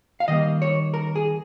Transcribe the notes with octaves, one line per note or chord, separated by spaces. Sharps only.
F5
D#3 G3 A#3 D#5
C#5
A#4
G#4